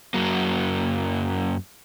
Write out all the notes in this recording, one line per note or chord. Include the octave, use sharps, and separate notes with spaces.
F#2 F#3 A#3